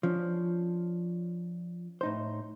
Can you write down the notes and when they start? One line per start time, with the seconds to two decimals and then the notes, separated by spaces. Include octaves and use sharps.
0.03 F3 C#4 D4
2.01 A2 D#4 C5